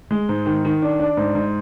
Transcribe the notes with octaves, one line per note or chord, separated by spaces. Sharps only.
G#3
G#2
D#3
D#3
D4
D4
G#2
G#2